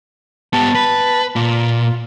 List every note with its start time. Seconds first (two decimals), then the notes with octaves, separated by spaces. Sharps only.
0.53 B3 G4 A5
0.75 B4
1.36 A#2 F4